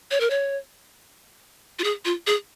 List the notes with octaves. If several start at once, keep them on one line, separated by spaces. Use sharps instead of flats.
C#5
A#4
C#5
F4
G#4
F4
G#4